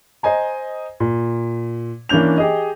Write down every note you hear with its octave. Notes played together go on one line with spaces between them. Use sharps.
C5 D#5 G#5 A#5
A#2
E3 A#3 C#4 D4 G6 F7
G4 G#4 D#5